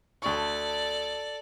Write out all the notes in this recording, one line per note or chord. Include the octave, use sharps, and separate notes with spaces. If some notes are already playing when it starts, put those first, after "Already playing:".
D2 A4 D5 C#6